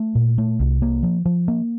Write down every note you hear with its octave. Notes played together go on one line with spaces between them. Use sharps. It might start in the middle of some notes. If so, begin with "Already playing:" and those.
Already playing: A3
A#2
A3
C2
A#3
F3
F3
A#3